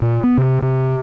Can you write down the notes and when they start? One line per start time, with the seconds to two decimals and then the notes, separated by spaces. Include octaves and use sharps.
0.02 A#2
0.23 B3
0.37 C3
0.62 C3